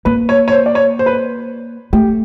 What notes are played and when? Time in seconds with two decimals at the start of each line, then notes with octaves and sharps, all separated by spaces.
0.05 A#3 B4
0.29 C#5
0.48 C#5
0.52 C5
0.66 D5
0.75 C#5
0.99 C5
1.06 B4
1.13 C5
1.93 A3 G4